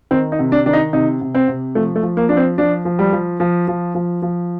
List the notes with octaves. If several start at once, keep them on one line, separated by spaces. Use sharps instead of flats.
D#3 C4
D#4
C3
D4
D#3 D4
D#4
C3 D#4
C3
C4
C3
F3 A3
A3
F3
A#3
F3 D4
C4
F3 D4
F3
G3
F3
F3
F3
F3
F3